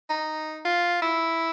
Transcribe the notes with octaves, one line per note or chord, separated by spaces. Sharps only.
D#4
F4
E4